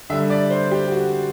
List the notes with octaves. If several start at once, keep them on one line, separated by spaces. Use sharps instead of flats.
D3 G3 E5
D5
C5
G4
F#4